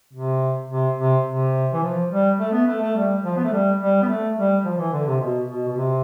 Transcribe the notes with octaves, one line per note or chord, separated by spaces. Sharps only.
C3
C3
C3
C3
E3
F3
G3
A3
B3
A3
A3
G3
F3
B3
A3
G3
G3
B3
A3
G3
F3
E3
D3
C3
B2
B2
B2
C3